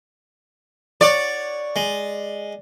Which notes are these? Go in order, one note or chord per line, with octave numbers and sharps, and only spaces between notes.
C#5 D5 F#5
G#3